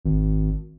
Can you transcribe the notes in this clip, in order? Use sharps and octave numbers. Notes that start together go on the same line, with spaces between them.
G#1